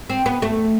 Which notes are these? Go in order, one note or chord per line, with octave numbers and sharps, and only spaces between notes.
C4
B3
A3